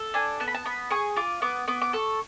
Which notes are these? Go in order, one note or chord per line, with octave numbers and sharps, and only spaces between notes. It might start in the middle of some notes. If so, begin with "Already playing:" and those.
Already playing: A4
D4 G#5
B3 A5
B5
A5
B3 B5
G#4 C#6
F4 D6
B3 D6
B3 D6
D6
A4 C#6